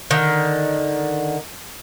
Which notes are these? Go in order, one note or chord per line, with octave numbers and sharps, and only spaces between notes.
D3 D#3